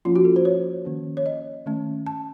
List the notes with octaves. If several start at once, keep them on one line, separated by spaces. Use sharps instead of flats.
F3 A#3 C#4 F4
F#4
A4
C5
C#5
D#3 A#3 C#4
C#5
D#5
D#3 A3 C#4
A5